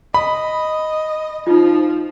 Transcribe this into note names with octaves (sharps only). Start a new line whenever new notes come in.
D#5 B5
F3 D#4 F4